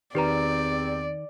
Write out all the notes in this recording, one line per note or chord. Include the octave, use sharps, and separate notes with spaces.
E2 D#3 C4 G4 B4 D5 A#5